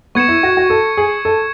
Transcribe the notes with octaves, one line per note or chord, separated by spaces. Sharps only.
B3 C#6 G#6 C#7 E7
E4
F#4
F#4
A4
G#4
A4